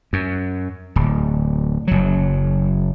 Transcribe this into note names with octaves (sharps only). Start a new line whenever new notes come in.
F#2
D1
F#1 F#3